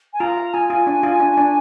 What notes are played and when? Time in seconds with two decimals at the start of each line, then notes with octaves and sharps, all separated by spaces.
0.13 G#5
0.20 F4 A#5
0.37 F5
0.54 F4 G#5
0.70 F4
0.87 D4
1.03 F4
1.20 D4
1.37 D4